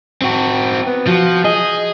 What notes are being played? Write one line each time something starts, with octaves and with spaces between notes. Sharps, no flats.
C4 F#4
B3
F3 F#4
G#4 D#5